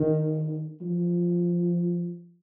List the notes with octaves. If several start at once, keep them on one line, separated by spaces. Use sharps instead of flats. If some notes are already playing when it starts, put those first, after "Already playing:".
Already playing: D#3
F3